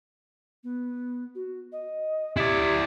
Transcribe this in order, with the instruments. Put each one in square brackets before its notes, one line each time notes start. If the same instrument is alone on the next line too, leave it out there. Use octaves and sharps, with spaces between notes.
[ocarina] B3
F#4
D#5
[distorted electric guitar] E4 D5 [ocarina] G4